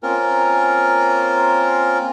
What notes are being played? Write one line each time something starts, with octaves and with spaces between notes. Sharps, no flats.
A#3 C4 C#4 F4 A#4